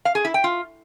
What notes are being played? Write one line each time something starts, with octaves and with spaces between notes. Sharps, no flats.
F5
G#4
E4
G5
F4